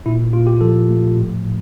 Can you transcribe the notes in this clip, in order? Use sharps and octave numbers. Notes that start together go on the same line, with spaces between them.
A#2 E4
A#2 F4
G4
F3 A4
A3
A2
A2